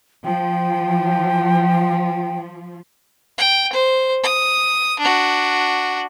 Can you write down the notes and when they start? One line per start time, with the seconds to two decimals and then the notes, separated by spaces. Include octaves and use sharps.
0.25 F3 G5
3.38 G5
3.73 C5
4.24 D#6
5.00 D4 F#4